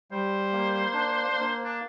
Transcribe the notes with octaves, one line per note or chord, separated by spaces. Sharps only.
G3 C5
A#3
D4
A#3
D4